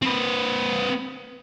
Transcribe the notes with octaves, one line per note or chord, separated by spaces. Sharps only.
C4 B4